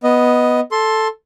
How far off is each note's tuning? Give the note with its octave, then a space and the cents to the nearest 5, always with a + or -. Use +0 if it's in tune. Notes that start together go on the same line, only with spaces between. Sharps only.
B3 +0 D#5 +0
A4 +0 C6 +15